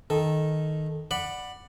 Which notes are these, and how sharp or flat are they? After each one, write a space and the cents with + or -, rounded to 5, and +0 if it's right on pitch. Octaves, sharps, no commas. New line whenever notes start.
D#3 +0 A4 -10
D5 +15 F#5 -5 B5 +0